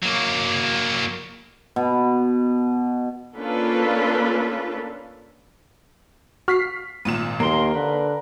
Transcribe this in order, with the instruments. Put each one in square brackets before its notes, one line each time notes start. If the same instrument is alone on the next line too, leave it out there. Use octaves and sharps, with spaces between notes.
[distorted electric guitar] F#3 A#3
[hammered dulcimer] B2
[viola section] A#3 C#4 D4 F4 A4 B4
[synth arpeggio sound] F#4 [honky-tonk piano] F6 B6 C7
[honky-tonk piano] G#1 A#2 E7 [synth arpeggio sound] D#7
[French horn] D#2 [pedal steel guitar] A#3 C6 [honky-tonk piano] A#4
[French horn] D3 [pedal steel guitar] B4